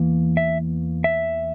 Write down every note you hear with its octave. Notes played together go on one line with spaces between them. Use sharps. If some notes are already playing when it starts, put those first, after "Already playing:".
Already playing: E2 E3 A#3 E4
E5
E5